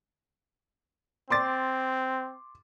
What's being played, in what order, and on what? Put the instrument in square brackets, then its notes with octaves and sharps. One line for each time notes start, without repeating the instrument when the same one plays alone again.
[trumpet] C4 [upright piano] C6 D6 A6